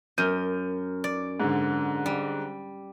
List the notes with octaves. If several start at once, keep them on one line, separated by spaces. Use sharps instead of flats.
F#2 F6 G6 D#7
D5
G#2 D3
G3